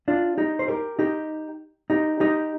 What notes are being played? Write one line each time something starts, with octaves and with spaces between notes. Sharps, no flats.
D4 F4
D#4 G4
C5
G4 A#4
D#4 G4
D#4 G4
D#4 G4